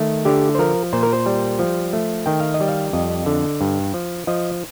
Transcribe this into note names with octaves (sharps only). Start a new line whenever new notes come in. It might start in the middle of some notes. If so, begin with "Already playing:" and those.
Already playing: D#3 A3
D3 G4
C5
F3 A#4
A#2 C5
A#4
C5
G3
F3
A3
D#3 G5
F5
D#5
G3
F5
F2 D#5
D3
G2
F3
F3 D#5